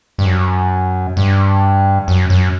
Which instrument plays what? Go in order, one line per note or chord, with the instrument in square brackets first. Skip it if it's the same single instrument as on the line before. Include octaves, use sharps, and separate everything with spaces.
[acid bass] G2
F#2
G2
F#2
F#2